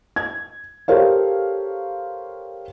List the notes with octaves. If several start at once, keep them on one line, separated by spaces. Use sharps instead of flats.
G#6
G4 A4 A#4 C5 C#5 F5